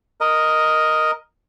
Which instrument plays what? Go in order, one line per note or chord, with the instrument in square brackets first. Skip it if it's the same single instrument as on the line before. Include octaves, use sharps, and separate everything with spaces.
[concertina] A#4 D#5